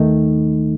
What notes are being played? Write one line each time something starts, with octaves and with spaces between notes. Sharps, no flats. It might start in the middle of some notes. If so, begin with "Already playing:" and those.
Already playing: D#2 D#3 A3 D#4